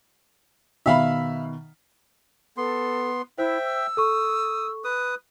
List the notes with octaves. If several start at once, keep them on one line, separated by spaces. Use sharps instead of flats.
B2 D#3 E5 F5 B5
B3 A4 C6
E4 C5 E5 G5
E6
A4 C#6 D#6
B4 D#6